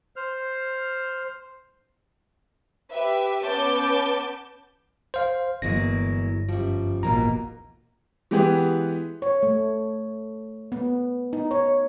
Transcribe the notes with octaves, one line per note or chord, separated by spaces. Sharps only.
C5 F6
G4 B4 E5
B3 C#4 A5 D6 G6
C5 F5
G1 E2 F#3 G#3 A#3 A#6
F#2 F3 G3
E1 A#1 G#2 B2 A#3 F4 A#5
E3 G#3 B3 G4 G#4 B4
C#5
A3
B3
D#4
C#5